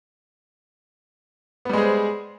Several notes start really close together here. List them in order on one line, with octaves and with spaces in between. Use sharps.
B3 G3 G#3 G#4 C5